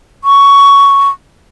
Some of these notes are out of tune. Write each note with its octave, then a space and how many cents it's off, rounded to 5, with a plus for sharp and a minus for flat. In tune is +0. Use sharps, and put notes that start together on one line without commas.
C#6 +10